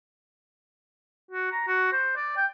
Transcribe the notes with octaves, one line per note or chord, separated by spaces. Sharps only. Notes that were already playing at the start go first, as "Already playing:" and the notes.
F#4
A#5
F#4
C5
D5
G5